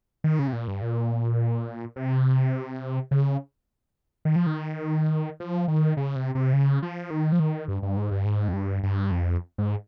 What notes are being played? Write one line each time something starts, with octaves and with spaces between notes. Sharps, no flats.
D#3
C#3
C3
A#2
G2
A#2
C3
C#3
D#3
F3
D#3
F3
D#3
C#3
C3
C3
C#3
F3
D#3
F3
D#3
G2
G2
G#2
G2
G#2
F2
G2
G2
F2
G#2